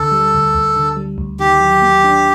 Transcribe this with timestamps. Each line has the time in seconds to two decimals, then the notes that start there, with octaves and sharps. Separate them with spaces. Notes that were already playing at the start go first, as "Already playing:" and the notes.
Already playing: D2 D3 A4
0.12 G3
0.34 D2
0.54 D2
0.76 D3
0.97 G3
1.18 D2
1.39 D#3 G4
1.61 F#3
1.82 A#3
2.04 D4